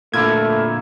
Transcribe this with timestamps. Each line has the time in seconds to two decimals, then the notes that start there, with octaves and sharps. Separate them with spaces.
0.14 A#2 D3 A3 A#3 E4 F4 G#6